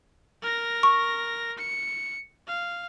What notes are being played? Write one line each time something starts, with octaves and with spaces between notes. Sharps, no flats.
A#4 A#6
C#6
C#7
F5